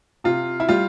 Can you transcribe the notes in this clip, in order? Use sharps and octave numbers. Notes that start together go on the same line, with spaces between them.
C3 F4
E4
G3 F4